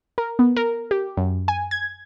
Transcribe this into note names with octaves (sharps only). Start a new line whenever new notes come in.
A#4
B3
A#4
G4
F#2
G#5
G#6